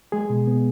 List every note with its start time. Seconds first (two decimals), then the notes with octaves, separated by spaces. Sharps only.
0.12 G#3 G#4
0.30 B2
0.47 B3